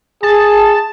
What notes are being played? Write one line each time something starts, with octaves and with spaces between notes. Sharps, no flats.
G#4 A5